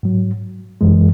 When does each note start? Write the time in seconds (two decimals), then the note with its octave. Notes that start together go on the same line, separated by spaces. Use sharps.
0.03 G#2 F#3
0.81 F#2 E3 G#3